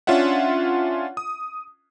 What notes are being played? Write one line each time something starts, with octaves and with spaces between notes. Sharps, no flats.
C#4 D4 F4 C#5 E5 F#5
D#6